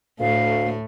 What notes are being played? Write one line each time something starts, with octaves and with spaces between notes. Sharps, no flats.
D2 A2 A3 F5